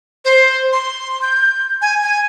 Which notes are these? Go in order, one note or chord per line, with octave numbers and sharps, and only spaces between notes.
C5
C6
G6
G#5
G#5